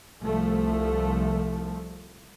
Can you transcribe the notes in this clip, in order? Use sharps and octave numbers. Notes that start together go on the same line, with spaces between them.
C2 F3 A3